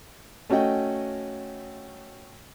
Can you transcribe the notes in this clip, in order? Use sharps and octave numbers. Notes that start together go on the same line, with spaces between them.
A3 C#4 F#4 D#5 G5